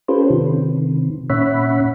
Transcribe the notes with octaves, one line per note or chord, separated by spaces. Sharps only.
C#4 F4 G4 A4 B4 C5
C3 D#3
A#2 C#4 C#5 E5 F#5 B5